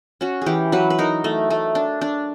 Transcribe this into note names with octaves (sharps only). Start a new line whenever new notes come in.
C#4 F#4
E3 G4 G#4
F#3 B4
B4
D#4 A#4
A3
A3
D4
D4